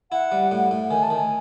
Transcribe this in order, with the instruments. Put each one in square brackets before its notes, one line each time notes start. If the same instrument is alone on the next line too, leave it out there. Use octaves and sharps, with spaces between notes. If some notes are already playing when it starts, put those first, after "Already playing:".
[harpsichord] E4 [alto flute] F#5
[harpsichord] G3
A2
A2
[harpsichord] D#3 [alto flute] G#5
[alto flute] A5
[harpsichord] D#3 [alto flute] G#5